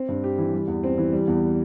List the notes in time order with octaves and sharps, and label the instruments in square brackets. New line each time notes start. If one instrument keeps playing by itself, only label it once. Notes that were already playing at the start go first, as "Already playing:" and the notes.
Already playing: [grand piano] C4
G2
G4
E3
G3
E2
C4
E3
G3
E2